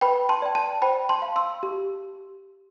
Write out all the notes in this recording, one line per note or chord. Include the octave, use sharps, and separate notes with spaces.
B4 G5 B5
A5 C6
D5 G5
A5
C5 G5 B5
A5 C6
F5
C6 E6
G4